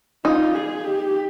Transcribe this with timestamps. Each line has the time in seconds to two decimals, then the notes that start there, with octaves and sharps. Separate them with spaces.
0.25 D#4 F4
0.55 G#4
0.85 G4